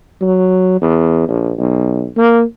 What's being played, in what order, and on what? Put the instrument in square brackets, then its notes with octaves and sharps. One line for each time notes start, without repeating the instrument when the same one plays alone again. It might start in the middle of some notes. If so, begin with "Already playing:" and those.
[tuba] F#3
E2
A#1
B1
A#3